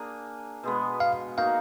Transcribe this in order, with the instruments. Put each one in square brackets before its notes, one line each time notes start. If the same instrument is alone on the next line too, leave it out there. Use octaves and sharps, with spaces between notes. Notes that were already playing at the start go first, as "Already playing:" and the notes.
Already playing: [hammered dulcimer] A#3 D4 G#4
B2 G#3 B3
[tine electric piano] F5
[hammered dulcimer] A#3 D#4 F#4 [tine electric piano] F5